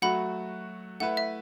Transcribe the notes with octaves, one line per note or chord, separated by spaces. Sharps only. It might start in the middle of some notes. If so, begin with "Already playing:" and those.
F#3 A3 F#4 F#5 B5
A3 E4 B4 F#5
E5